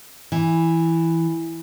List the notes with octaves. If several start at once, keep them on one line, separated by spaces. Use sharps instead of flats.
E3